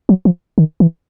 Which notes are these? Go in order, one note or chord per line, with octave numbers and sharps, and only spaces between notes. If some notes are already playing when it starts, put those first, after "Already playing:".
F#3
F3
D#3
E3